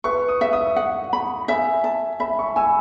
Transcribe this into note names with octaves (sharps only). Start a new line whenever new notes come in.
B4 C#6
D#6
E5
D#6
F#5
B5
E5 G#5
A5
E5 B5
C#6
G#5 E6